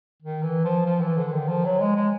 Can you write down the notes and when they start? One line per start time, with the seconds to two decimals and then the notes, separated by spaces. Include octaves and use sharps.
0.23 D#3
0.43 E3
0.65 F3
0.86 F3
1.01 E3
1.17 D3
1.33 D#3
1.49 F3
1.65 F#3
1.80 G#3
1.96 G#3